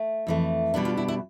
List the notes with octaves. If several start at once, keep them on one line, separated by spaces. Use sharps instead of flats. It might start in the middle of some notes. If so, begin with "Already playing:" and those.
Already playing: A3
F2 E3 A3
B2 G3 B3 D4
F4
E4
E4